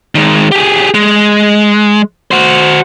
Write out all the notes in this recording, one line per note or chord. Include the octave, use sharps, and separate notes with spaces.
D#3 G#3
G4 G#4
G#3
F#4 C5